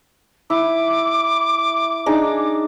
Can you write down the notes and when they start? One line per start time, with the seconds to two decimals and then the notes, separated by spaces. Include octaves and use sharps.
0.50 E4 D6
2.06 D4 D#4 G#4